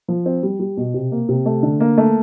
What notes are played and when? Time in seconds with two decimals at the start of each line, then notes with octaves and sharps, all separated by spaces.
0.08 F3
0.26 C4
0.43 G3
0.60 G3
0.77 B2
0.94 C3
1.12 A#3
1.29 C3
1.46 A3
1.63 D3
1.80 A#3
1.98 A3